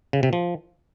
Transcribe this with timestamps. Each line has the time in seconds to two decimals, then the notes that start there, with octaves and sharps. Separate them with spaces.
0.13 C#3
0.23 C3
0.33 F3